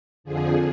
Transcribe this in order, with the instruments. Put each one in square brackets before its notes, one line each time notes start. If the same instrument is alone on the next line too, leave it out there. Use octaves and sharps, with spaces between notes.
[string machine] F2 D3 F3 G#4